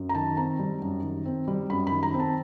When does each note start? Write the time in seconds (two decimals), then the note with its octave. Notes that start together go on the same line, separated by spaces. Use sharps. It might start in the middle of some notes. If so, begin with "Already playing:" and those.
Already playing: F#2
0.09 A#5
0.15 D#3 A5
0.37 C4 A#5
0.59 G3
0.82 F#2
1.03 D#3
1.25 C4
1.48 G3
1.70 F#2 B5
1.87 D#3 B5
2.03 A#5
2.14 C4
2.20 A5